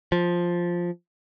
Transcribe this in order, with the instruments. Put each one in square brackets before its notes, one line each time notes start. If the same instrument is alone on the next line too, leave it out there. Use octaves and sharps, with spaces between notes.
[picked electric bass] F3